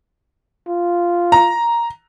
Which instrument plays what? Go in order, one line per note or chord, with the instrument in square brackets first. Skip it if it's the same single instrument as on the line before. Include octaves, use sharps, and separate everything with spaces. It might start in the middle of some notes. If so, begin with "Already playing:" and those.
[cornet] F4
[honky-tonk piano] A#5